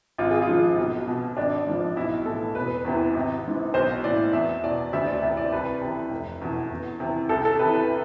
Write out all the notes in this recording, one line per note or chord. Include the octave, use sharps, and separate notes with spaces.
G#1 F4
G#4
F4
G#2 F3
B1
B2
G#1 D4
G#2 F3
B1 E4
A2 E3 A4
E1 B4
E2 C3 E3
G#1
G#2 E3
B1 C5
A2 E3 D5
E2 E5
B2 D5
D2 E5
D5
C3 E3 E5
D5
C2 B4
C3
E3
F1
E2 B2
E2
C3 E3
C2 A4
A4
C3 E3 B4
B4